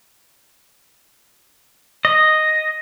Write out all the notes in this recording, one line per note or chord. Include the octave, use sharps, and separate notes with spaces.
D#5